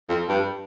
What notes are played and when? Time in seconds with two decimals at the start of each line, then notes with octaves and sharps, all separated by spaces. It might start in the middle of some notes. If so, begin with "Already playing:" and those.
0.09 F2
0.29 G2